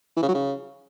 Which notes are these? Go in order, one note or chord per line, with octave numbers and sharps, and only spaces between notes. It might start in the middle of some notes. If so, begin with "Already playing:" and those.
E3
C#3
F#3
C#3